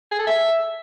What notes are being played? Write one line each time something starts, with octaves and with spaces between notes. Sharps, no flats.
G#4
A4
E5